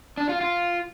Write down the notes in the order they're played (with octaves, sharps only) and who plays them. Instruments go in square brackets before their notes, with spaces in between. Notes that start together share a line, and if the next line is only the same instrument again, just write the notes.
[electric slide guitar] D4
F4
F4